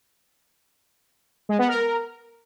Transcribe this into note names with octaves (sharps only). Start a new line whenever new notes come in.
G#3
B3
A#4